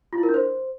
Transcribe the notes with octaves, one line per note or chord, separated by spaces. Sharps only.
F4
E4
A#4
D4
C5